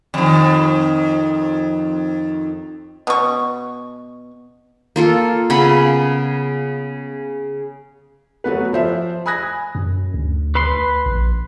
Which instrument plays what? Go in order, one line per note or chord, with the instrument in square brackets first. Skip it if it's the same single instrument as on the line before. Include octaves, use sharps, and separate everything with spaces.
[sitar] F2 D#3
[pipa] B2 C#6
[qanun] A#3 F4 A4
C#3 B3 B5
[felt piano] F#3 A3 B3 B4
F3 C5 E5
G#5 B5 D#6 F#6 G#6 A#6
[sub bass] F#2
D2
[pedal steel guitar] B4 B5 C6
[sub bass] A#1